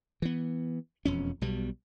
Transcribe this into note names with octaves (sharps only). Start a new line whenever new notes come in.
E3 B3
E1 F2 C#4
B1 B2 G3